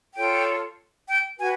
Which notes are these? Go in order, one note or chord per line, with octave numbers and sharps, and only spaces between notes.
F4 A4 C#5 G5
G5
F#4 B4 G#5